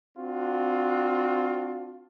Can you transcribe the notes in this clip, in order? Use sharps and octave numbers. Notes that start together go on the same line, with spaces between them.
C4 D4 F4 F#4